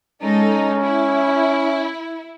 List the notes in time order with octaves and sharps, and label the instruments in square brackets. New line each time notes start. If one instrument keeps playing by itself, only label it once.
[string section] G#3 D#4 A4 [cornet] C#4
[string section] E4